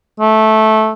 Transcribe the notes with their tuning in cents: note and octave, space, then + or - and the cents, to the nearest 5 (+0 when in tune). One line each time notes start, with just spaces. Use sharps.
A3 -10